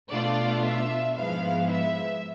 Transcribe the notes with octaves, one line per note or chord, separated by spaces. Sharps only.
B2 A3 D4 F4 D5
E5
G#2 F3 G#3 B3 E4 F5
E5